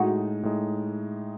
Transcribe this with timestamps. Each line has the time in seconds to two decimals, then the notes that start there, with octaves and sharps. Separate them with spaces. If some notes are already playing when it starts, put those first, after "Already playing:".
Already playing: A2 G#3 D#4 F#4
0.43 A2 G#3 D#4